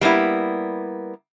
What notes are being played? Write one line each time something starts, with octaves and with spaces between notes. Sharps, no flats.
G3 A#3 B3 E4